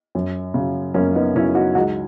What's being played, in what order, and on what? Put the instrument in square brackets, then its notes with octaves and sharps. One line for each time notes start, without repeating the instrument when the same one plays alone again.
[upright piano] F#2
C#3 F#3
F#2 A#3 C#4
B3 D#4
C#3 F#3 C#4 E4
D#4 F#4
C#2 D#4 F#4